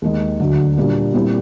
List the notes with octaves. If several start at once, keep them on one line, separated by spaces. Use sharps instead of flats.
D#2 D#3 G#3
D2 D3 F#3
A#2 G3 A#3 D4
A#2 G3 C4 E4